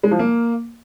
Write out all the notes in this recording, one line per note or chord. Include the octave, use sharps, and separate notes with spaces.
G#3
F3
A#3